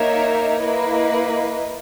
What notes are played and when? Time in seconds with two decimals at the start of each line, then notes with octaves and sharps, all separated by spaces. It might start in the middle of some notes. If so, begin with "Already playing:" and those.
Already playing: A#3 D#4 A#4 C#5 E5
0.60 A#3 E4 B4 D#5